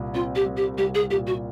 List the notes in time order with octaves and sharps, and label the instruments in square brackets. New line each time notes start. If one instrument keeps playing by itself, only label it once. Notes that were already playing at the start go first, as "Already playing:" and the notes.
Already playing: [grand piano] C2 A#2
[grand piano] C4 [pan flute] F4
[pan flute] G4
[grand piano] G3
[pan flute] G4
[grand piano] C2 [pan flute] G4
[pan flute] G#4
[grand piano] A#2 [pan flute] G4
[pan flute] F#4